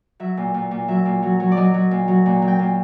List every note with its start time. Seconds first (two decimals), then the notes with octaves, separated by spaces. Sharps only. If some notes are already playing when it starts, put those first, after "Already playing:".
0.20 F#3 E5
0.37 A#2
0.54 A#2
0.71 A#2
0.88 F#3 E5
1.05 A#2
1.23 F#3
1.40 F#3
1.51 D5
1.57 F#3 D#5
1.74 F#3
1.91 A#2
2.08 F#3
2.26 A#2
2.42 F#3
2.48 G5
2.59 A#2